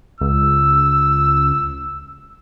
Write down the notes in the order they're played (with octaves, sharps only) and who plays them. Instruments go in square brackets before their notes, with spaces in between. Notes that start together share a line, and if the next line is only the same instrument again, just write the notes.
[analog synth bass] C#2 [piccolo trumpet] E6